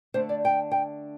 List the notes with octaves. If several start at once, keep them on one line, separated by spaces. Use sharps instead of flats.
D3 A3 D4 C5
D5
G5
G5